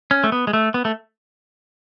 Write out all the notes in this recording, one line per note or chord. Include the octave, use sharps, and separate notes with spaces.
C#4
A3
B3
G#3
A3
B3
A3